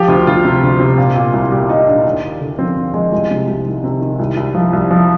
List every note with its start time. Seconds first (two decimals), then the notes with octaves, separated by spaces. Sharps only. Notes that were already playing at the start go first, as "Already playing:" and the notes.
Already playing: F3 G4
0.08 D2 F4
0.27 D2 F4
0.45 C3
0.63 D2
0.80 C3
0.98 A#2
1.16 A#2
1.33 C2
1.52 A#2 G4
1.69 A#2 D#4
1.87 A#2 D4
2.05 D#2
2.22 D#2
2.41 D3
2.58 F3 C4
2.76 D#2
2.94 F3 G#3
3.12 C2 G#3
3.30 C3
3.48 C2
3.65 D#3
3.84 C3
4.01 D#3
4.19 C2
4.37 C2
4.55 F3
4.73 C2
4.91 F3